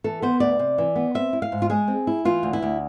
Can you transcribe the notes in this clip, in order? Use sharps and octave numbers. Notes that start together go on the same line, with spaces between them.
E3 A4
B3 C5
D2 D5
C3
E3
B3
C4 E5
E4
F5
G#2
F4
G#3 G#4
C4
E4
E3 F4
D2
E4
D2